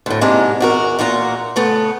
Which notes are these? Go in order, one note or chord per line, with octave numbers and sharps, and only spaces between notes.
D2 A2
G#2 C3 G#3 A#3 D4
E2 F#4 A#4
E2 A#2 F4 F#4 A#5
C#3 A3 B3